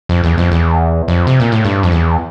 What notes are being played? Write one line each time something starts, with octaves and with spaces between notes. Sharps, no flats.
F2
E2
F2
E2
F2
C3
A#2
A2
G2
F2
E2